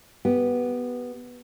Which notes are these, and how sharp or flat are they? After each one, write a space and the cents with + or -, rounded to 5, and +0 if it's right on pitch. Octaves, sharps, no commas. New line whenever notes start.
B3 -5 G4 +0